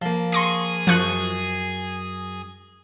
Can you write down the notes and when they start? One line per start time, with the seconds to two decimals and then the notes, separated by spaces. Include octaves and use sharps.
0.02 F3 A#3
0.33 G#4 C6 C#6 A#6
0.87 F#2 F3 C#6 F#6